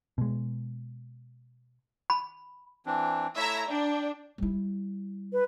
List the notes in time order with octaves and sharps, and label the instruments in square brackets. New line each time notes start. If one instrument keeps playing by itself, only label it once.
[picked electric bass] B2 G#3
[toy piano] B5
[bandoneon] E3 C4 D4
[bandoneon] A3 E4 C#5 [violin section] E5 A#5
[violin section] D4 [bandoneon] G5
[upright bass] G3 E4
[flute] B4